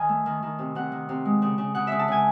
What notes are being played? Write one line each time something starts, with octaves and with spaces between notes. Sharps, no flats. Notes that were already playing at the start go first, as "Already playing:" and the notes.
Already playing: D#3 G#5
A3
D#3
D#3
C3
C3 F#5
D#3
C3
G#3
C#3
C#3
C#3 F#5
C#3 E5
A5
C#3 G#5